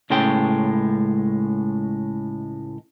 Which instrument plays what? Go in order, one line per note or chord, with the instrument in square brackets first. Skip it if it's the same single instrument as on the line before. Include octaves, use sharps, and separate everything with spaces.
[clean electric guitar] C#2 A2 G#3 C#4 G5